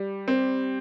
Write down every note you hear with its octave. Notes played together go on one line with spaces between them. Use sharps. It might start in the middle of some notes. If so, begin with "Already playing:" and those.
Already playing: G3
C4